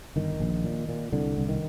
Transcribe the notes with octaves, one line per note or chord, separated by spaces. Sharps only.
G1 D#3
A#1
A#2
A#2
C2 D3
C2
D#3